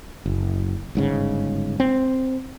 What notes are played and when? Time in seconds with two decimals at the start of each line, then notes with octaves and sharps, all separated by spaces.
0.26 F#1
0.95 G1 G#2 C#3
1.80 C4